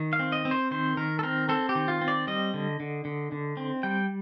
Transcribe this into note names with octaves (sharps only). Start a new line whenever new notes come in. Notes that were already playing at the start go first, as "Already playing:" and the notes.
Already playing: D#3
F5
C4
D#5
C4
C5
D#3 C5
D#3 A#4
A4
C4 A#4
C4 A4
G4
D#3
F4
C4
D5
G3 D#5
D3
D3
D3
D3
C4
G3 G5